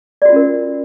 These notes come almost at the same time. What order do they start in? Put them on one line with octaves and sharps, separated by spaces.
D5 F#4 F4 C#4 A#4